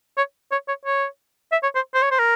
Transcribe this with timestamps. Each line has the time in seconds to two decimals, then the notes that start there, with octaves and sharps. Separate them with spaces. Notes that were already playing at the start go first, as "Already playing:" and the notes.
0.17 C#5
0.52 C#5
0.68 C#5
0.85 C#5
1.52 E5
1.63 C#5
1.75 C5
1.94 C5
2.02 C#5
2.11 C5
2.19 A#4